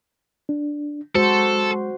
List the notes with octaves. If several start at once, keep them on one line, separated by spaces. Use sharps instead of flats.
D4
G#3 F#4 A4 C5